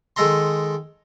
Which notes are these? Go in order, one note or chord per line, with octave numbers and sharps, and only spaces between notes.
D#3 G#3 A4 A#5 C6